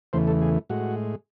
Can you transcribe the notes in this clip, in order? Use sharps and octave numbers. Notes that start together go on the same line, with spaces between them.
E2 C#3 E3 A3 C5
A4
G#4
A2 G#3 F#4